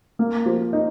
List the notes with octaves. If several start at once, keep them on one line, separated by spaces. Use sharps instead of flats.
A#3
F3
D#4